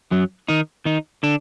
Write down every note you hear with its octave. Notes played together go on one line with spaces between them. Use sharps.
F#2 F#3
D#3 D#4
D#3 D#4
D3 D4